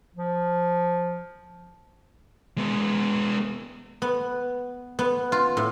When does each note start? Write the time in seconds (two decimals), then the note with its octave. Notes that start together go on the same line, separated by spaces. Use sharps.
0.15 F3
2.58 G#3 B3
4.02 B3
4.99 B3
5.32 F4
5.57 A2